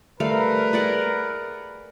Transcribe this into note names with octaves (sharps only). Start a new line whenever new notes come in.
G3 A3 A#4 B4 F5
G#4 D5 F#5